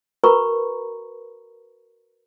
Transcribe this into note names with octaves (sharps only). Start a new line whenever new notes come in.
F#4 A#4 B4 A#5 B5 C#6